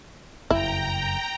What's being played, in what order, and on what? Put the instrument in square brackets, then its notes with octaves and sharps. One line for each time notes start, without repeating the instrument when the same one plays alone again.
[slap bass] F#1 F2 C#3 [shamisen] E4 [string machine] G5 A#5